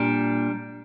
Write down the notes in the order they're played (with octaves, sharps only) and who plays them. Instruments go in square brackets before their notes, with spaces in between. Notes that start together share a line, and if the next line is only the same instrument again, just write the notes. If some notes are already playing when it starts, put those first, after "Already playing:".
Already playing: [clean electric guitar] A#2 G3 D4